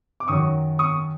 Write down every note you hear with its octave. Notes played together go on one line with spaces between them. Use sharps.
D6
F#2 D#3 F#3 C#6 D#6
C#6 D#6